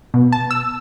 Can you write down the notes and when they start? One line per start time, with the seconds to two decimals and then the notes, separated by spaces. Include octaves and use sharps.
0.14 B2
0.32 A5
0.51 E6